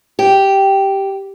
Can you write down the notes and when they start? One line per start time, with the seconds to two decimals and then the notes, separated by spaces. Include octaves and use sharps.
0.19 G4